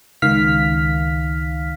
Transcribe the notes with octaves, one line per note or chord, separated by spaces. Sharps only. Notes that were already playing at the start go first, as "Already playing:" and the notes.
C#2 D#3 F5 F6 B6